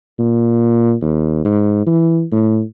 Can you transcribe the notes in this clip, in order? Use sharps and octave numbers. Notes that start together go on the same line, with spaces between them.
A#2
D#2
G#2
E3
A2